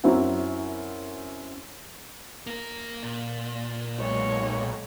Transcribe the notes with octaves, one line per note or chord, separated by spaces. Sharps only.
F#2 C4 E4 F#4
A#3 A#4
A#2
B1 G#3 C#5